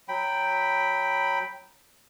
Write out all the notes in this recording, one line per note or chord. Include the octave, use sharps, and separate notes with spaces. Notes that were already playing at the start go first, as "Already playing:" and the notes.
F#3 G5 B5